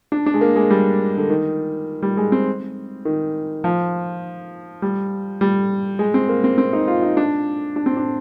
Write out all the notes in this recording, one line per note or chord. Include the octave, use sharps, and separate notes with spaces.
D4
D4
G#3
A#3
G#3
G3
D3
D#3
G3
G#3
C4
D#3
F3
G3
G3
G#3
C4
A#3
C4
C4
D#4
F4
D#4
D4
D4
C4
D4